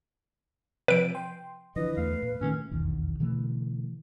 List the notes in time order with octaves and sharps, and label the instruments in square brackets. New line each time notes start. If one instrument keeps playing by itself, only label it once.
[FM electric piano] C3 F3 [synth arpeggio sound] B4 D7
[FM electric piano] G5 C6
[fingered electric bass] D3 E3 F3 [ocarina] B4 [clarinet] D#5
[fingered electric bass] E2 A3 [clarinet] F5
[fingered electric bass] A#2
[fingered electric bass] A#2 D#3 A3 [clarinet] C#4
[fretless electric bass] F1 B1 E2 D#3
B2 D3 E3 A3